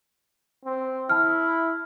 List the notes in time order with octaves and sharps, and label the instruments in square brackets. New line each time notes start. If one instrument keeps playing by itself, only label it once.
[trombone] C4
[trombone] E4 [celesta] A5 F6